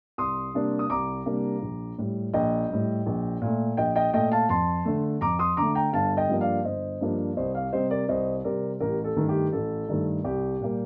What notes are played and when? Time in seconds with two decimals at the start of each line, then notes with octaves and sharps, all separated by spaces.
0.18 C2 C6 D#6
0.54 C3 G3 A#3 D4
0.79 D#6
0.90 C2 A#5 D6
1.26 C3 G3 A#3 D4
1.62 A#1
1.98 A2 G3
2.34 A#1 D#5 G5
2.70 A2 G3
3.06 A#1
3.42 A#2 A3
3.77 A#1 D#5 G5
3.96 D#5 G5
4.13 A#2 A3 D#5 G5
4.32 F5 A5
4.49 F2 A5 C6
4.85 D3 A3
5.21 F2 A#5 D6
5.39 C6 D#6
5.57 D3 A3 A#5 D6
5.75 G5 A#5
5.93 G1 F5 A5
6.17 D#5 G5
6.29 G2 F3 A#3 D4
6.41 D5 F5
6.65 G1 C5 D#5
7.01 G2 F3 A#3 D4
7.37 C2 C5 D#5
7.55 D5 F5
7.73 C3 G3 C4 C5 D#5
7.90 A#4 D5
8.09 C2 C5 D#5
8.44 C3 G3 C4 A#4 D5
8.80 A1 G4 A#4
9.04 A4
9.16 G2 D#3 A3
9.29 G4
9.52 A1 A4
9.89 G2 D#3 A3
10.24 C2 G4
10.60 A#2 G3 A#3